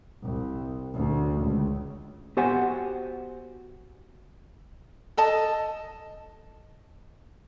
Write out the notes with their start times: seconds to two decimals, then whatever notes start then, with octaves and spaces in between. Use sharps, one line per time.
0.23 C2
0.94 D2
1.41 C#2
2.37 B3 F#4 G4 C5 F#5 G#5
5.17 A4 D#5 A5